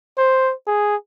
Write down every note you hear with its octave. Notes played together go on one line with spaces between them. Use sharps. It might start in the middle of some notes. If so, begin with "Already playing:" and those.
C5
G#4